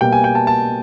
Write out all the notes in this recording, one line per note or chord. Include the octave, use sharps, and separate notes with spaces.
B2 G3 A#3 G5
G#5
G5
A5
A5